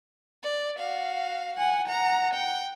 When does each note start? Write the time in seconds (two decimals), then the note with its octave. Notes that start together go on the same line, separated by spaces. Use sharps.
0.43 D5
0.78 F#4 F5
1.57 F#5 G#5
1.88 F#5 A#5
2.34 G5